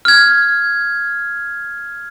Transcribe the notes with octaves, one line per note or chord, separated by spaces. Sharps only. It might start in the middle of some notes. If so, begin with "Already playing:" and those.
F6 G#6